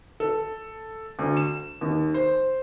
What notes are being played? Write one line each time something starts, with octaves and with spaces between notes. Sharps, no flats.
A4
D2
E7
D#2
C5